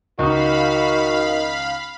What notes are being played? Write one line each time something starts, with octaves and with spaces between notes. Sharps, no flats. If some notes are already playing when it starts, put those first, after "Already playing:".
C#2 D#3 D#4 F#4 F5 B5